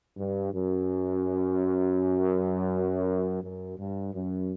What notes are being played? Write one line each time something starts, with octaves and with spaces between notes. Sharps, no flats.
G2
F#2
F#2
G2
F#2